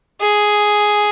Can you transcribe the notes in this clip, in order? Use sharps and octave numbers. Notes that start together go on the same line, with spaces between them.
G#4